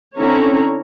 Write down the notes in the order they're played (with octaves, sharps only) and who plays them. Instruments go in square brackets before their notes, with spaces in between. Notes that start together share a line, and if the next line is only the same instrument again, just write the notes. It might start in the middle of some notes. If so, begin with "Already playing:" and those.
[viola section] D3 C4 C#4 E4 C#5 A#5